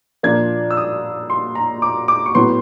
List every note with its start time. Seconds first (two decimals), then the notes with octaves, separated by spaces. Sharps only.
0.23 A#2 F3 A#3 D4 G#6
0.71 E6
0.77 D#6
1.30 C6
1.55 A#5
1.82 D6
2.08 D6
2.26 C#6
2.35 A2 F#3 B3 C6